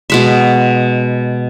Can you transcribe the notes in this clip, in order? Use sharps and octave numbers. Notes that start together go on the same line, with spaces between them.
B2 G#3 E5